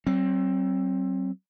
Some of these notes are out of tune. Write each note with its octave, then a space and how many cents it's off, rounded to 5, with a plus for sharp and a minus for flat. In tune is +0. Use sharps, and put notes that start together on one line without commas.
F#3 +45 C4 +20